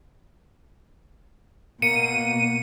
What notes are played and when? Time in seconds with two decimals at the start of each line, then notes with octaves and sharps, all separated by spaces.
1.82 B2 A#3 C#7 D#7